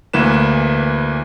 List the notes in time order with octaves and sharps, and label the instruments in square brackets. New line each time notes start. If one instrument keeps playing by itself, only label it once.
[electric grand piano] D2 E3 A#3 B4 E7